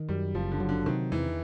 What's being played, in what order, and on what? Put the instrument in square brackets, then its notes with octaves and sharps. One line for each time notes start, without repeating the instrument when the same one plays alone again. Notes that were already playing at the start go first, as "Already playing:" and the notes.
Already playing: [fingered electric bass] D#3
[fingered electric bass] F#2 [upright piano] G3
[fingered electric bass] F#1 [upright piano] F3
[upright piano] D3
[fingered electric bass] F#3
[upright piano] D3
[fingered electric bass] C3 [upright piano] D#3
[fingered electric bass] E2 [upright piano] E3